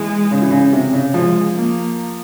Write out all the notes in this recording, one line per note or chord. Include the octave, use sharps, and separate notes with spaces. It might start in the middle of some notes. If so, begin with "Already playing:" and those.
Already playing: E3 G#3
C#3
E3
C#3
C3
C#3
F3 G#3
A#3